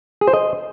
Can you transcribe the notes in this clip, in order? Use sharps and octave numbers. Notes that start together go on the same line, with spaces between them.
G#4
C5
D#5